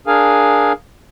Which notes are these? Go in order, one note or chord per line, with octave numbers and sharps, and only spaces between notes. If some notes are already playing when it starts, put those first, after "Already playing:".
D4 G#4 A#4 F5 G#5